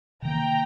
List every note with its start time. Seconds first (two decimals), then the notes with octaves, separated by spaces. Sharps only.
0.22 C3 D#3 A#3 G5 A#5